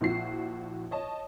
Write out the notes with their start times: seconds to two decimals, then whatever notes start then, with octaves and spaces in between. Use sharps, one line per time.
0.01 A#1 F3 E4 F#4 C7
0.91 C#5 D#5 A5